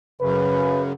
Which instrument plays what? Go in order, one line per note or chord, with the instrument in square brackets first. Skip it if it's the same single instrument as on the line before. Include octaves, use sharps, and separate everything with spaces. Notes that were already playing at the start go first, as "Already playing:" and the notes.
[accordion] F#2 C#3 [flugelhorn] B4